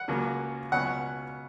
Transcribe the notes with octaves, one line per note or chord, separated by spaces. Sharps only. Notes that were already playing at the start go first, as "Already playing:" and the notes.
Already playing: F#5
C#2 C#3 F#3 A#3 C#4
C#2 B2 F#3 C#4 F#5